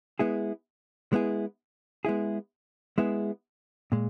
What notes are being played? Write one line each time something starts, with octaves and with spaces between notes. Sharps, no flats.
G#3 B3 E4 G#4
G#3 B3 E4 G#4
G#3 B3 E4 G#4
G#3 B3 E4 G#4
A#2 G#3